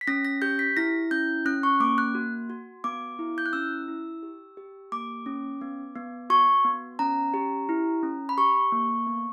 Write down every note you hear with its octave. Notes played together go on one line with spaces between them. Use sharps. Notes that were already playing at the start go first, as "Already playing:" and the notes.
B6
C#4 A#6
A#6
G4 G6
B6
E4 A#6
C#4 G6
C#4 F#6
C#6
A#3 D6
F#6
F#4
F#4
B3 D6
E4
G6
F#6
C#4 E6
E4
G4
G4
A#3 D6
C#4
B3
B3
F#4 C#6
B3
C#4 A#5
G4
E4
C#4
B5
G4 C#6
A#3
B3